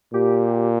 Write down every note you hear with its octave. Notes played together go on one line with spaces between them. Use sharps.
A#2 G4